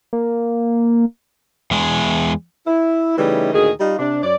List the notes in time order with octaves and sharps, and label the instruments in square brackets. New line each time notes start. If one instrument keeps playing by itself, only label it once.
[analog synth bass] A#3
[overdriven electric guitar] E2 G#3
[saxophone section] E4
C#3 E3 G3 A3 D#4
D2 A#2 D#3 G#4
G3 D#4 F4
C3 D4
F#2 C#5 D5